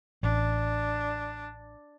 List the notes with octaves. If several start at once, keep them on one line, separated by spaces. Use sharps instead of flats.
A1 D4